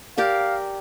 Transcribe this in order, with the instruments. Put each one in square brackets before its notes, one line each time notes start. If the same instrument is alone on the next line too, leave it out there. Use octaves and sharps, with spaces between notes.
[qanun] G4 A#4 D5 [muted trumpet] F5